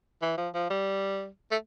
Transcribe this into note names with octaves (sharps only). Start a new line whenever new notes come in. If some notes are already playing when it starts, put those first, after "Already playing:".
E3
F3
F3
G3
A3